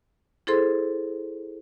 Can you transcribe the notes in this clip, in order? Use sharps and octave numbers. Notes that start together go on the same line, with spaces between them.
E4 G#4 A4 C5 C6